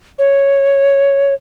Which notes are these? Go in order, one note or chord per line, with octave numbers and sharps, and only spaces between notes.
C#5